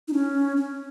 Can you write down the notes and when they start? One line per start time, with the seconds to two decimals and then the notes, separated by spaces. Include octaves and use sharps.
0.08 D#4
0.13 C#4
0.57 C#4